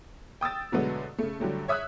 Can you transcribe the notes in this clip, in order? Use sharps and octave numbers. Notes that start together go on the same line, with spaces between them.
G5 D#6 E6 A6
B2 D3 F#3 G#3 A3 B3
C#3 A3
D3 F#3 G3 A3
C#5 E5 D#6 E6 F#6